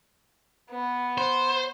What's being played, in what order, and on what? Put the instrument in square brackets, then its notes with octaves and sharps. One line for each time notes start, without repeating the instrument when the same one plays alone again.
[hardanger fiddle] B3
[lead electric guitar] C5